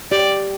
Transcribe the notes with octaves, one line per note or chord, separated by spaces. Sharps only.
G4 D5